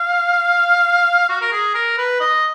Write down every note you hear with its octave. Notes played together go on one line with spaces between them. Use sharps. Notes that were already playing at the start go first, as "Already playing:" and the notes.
Already playing: F5
F#4
A#4
G#4
A#4
B4
D#5